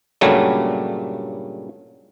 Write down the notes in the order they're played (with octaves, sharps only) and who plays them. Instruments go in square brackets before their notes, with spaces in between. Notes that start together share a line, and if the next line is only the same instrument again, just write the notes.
[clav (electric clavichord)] G2 A#2 C#3 F#3 G3 A3